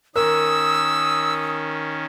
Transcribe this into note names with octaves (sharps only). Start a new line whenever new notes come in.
D#3 C#4 A#4 D#6 E6